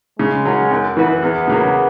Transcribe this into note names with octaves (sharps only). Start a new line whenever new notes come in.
C#3 G#3
F#3 C#4
F#2
E3 B3 F#4 B4
E2 B3
C#3 F#3 A#3